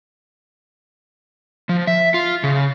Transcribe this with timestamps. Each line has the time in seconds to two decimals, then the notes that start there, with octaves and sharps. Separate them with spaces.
1.69 F3
1.87 E5
2.14 F4
2.44 C#3